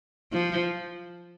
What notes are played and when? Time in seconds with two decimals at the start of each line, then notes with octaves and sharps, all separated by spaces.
0.32 F3